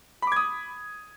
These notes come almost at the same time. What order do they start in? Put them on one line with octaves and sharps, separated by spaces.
B5 D6 G#6 D#6